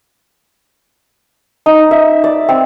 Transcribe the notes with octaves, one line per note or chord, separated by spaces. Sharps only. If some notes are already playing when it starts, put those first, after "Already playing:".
D#4
E5
D5
C4